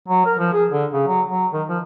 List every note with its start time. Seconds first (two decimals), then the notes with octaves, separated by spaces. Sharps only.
0.08 F#3
0.26 A#4
0.38 F3
0.53 G#4
0.71 D3
0.93 C#3
1.07 F#3
1.29 F#3
1.53 D#3
1.69 F3